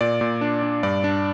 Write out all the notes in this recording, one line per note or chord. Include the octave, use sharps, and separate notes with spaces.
A#2 D5
A#2
D4
D4
G2 D5
D4